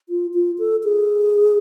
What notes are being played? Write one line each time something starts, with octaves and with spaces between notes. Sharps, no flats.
F4
F4
A4
G#4